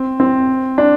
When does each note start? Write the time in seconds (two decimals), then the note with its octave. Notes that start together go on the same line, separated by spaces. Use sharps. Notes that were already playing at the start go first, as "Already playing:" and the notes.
Already playing: C4
0.20 C4
0.78 D4